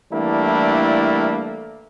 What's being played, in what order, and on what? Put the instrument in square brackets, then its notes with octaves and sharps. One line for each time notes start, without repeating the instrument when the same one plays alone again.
[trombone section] E3 G3 A3 A#3 D4 E4